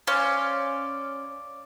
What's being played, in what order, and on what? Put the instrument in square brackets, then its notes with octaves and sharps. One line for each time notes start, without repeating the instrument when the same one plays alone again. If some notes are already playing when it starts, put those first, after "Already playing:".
[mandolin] C#4 [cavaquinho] C5 D5 F5